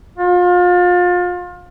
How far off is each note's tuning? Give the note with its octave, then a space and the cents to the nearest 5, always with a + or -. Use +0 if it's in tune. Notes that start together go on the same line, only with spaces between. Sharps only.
F4 +30